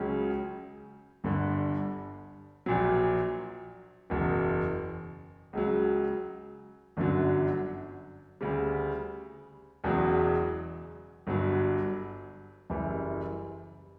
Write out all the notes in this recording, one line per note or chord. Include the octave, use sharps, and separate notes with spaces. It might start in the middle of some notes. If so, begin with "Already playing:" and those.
Already playing: C#2 C#3 F#3 C#4
G1 G2 D3
A#1 A#2 F#3
F#1 E2 B2
C#2 C#3 F#3
G1 F#2 D3 F#3
D2 C#3 G3
E1 E2 C#3 F#3
G1 G2 F#3
F#1 F#2 E3 G3